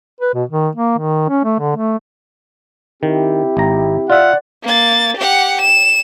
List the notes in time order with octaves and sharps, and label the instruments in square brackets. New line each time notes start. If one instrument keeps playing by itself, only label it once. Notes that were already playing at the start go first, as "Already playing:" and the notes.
[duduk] B4
B2
D#3
A#3
D#3
C#4
A3
D3
A3
[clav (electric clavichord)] D#3 [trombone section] C4 E4 G4
[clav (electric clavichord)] G#1 A#5
[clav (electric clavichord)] F4 E5 [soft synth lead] D5 [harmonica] F#5
[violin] A#3 A6
G4 F#5
E7